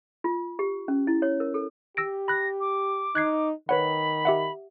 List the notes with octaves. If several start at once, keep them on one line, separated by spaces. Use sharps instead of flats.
F4
G4
C#4
E4
C#5
A#4
A4
G4 E6 A#6 D7
B5 F#6 A#6
D6
D#4 F#6 G#6 C7
D#3 B4 C#5 F#5 B5
G4 E5 F#5